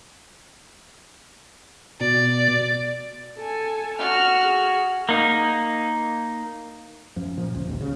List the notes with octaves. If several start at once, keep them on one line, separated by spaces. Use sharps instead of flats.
B2 D5
A4 G#5
F#4 F6
G#4
A#3 D#4
F#2 F3
A#2 F3
F1 C#2
E1 A#1 D#2
C#3